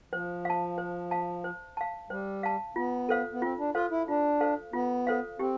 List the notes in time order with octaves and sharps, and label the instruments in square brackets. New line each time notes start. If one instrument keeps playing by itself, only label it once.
[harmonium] F3 [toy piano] C5
[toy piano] F5 A5
C5
F5 A5
C5
F5 A5
[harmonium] G3 [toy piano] C5
[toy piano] F5 A5
[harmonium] B3 [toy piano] F4
[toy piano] A4 C5 F5
[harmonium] B3
[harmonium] C4 [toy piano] F4
[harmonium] D4
[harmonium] F4 [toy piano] A4 C5 F5
[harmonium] E4
[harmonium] D4 [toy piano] F4
[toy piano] A4 C5 F5
[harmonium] B3 [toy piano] F4
[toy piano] A4 C5 F5
[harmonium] C4 [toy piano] G4